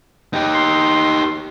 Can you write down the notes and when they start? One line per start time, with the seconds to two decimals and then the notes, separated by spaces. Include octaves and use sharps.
0.33 D#4 G4
0.54 C6